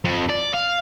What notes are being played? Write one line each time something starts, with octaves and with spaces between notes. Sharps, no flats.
F2
D5
F5